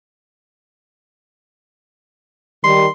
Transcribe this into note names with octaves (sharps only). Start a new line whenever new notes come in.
D#3 G3 C6